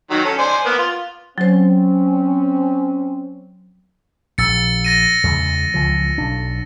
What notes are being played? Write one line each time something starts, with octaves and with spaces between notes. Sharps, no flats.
D#3 F#3
C#4 A4
C5 D5 G#5
A#3 B3
F4
F#3 C4 C#4 C5
A#1 E6 A6 C#7
A6 A#6 D#7
E2 C#3 G#3
C#2 E3 F3
B1 D4